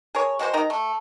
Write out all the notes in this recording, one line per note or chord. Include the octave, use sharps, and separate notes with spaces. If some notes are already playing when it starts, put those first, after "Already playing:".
G#4 A#4 C#5
G#3 F#4 A#4 C5
C3 D#4 A#4 A#5
A3